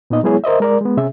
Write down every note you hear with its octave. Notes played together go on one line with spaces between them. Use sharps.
A#2 B3 D#4 D#5
F#3 G#3 B3 E4 G#4 C#5
A#4 C5 D#5 E5
G#3 A#4 D5
G#3 B3
C3 C#4 G#4 E5